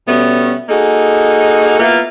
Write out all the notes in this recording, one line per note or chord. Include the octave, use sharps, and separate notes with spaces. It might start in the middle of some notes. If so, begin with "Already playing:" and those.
B2 G3 A3 B3 C#4
A#3 D#4 F#4 G#4 A4
A#3 B3 E4 F4